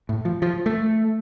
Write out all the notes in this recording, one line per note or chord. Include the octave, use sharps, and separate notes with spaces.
A2
F3
F3
A3